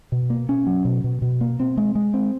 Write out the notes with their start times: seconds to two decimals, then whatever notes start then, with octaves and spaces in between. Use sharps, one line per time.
0.12 B2
0.30 A#3
0.49 C#4
0.67 F#3
0.85 B2
1.04 B2
1.22 B2
1.41 A#3
1.60 C4
1.77 G#3
1.95 G#3
2.14 C4